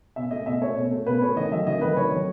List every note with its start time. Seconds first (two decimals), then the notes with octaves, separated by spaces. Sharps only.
0.16 B2 E5
0.31 A3 D#5
0.46 B2 E5
0.61 A3 C#5
0.76 B2
0.91 A3
1.07 B2 B4
1.21 A3 C#5
1.36 D#3 D#5
1.51 F#3 A3 E5
1.67 D#3 D#5
1.81 F#3 A3 B4
1.96 D#3 C#5
2.12 F#3 A3